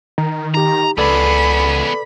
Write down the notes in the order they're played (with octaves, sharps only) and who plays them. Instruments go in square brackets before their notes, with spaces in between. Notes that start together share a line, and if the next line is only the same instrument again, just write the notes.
[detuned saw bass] D#3 [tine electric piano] A#5
[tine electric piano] D#4 G4 [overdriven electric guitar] A#5
[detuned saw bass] C#2 [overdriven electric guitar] B3 G#4 [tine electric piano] A4 B4 D5 [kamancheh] B5